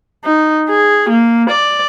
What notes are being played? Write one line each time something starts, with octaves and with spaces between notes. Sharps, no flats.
D#4
G#4
A#3
D5